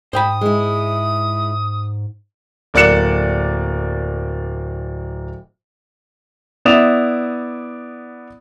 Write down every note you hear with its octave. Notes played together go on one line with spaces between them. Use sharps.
G#2 C5 G5 B5 D#6
G#3 E4
D1 A#3 D5 F#6 C#7 E7
B3 E4 D5 D#6 E7 F7